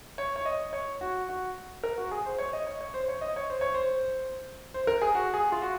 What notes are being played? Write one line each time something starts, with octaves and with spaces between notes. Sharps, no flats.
C#5
C#5
D#5
C#5
F#4
F#4
A#4
F#4
G#4
C5
C#5
D#5
C#5
C#5
C5
C#5
D#5
C#5
C5
C#5
C5
C5
A#4
G#4
F#4
G#4
F4
F#4